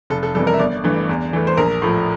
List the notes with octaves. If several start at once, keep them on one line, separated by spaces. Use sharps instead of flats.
F1 A4
A4
F2 E3 G3 A4
A#4
E5
G1 D5
G2 E3 A3
E2
E3 A3
C5
A#1 A#4
A2 F3 A3